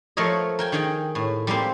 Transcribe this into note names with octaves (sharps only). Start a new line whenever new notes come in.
F3 A3 A#4 C#5 D#5
A#4 G5 G#5
D#3 D#4 G#4 D#5 G5
A2
G3 G#3 A#3 C4